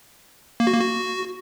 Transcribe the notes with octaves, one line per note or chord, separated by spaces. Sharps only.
A#3
F#4
A#3
F#4